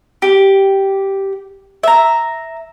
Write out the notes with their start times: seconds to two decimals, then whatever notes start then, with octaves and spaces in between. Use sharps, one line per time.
0.22 G4
1.83 E5 A#5